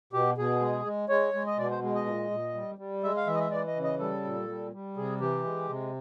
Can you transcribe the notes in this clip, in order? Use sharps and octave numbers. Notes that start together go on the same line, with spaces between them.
B2 G4
B2 G#4
G#3
G#3
G#3 C#5
G#3
D#5
B2 D5
C5
G#3
D#5
A#2
A#2
G3
G3
G#3 E5
F5
E3 E5
D#5
E5
E3 D5
D#5
C#3
D#5
G3 A4
A#2
G3
G3
C3 G#4
E3 G4
G#3
C3